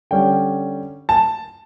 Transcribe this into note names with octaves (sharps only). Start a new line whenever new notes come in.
D3 G3 C#4 G5
A5